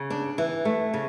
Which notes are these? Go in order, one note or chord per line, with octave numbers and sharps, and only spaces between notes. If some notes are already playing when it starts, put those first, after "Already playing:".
Already playing: C#3
D4
E3
A3
C#3